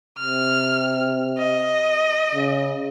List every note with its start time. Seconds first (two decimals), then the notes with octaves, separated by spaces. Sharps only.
0.19 C3 F6
1.38 D#5
2.34 C#3